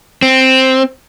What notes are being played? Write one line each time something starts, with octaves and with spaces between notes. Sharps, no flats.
C4